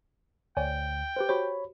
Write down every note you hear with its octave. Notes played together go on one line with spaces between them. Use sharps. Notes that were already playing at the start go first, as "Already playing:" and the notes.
D2 C#5 D5 G5 G#5
G4 B4 C5
F#4 G4 C5 C#5 B5